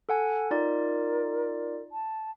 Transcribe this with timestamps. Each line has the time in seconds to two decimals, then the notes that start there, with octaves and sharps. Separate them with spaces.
0.09 A4 F#5 G#5
0.51 D#4 F4 A#4 D5
1.92 A5